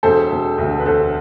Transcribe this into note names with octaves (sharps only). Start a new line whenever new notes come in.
E1 A4 C5
E1
D2
B4
E1 A4 C5